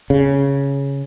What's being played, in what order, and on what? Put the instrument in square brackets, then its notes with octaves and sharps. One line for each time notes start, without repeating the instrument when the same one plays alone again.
[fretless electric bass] C#3